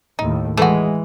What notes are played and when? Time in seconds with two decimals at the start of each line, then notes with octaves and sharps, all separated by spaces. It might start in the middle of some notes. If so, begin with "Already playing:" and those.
0.19 D#2 A2 D#4
0.57 E3 G#3 A3 F#4